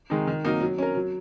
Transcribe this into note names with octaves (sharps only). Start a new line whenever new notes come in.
D#3 G#3 D#4
D#3
F#3 A#3 D#4 A#4
F#3
C#4 A#4
F#3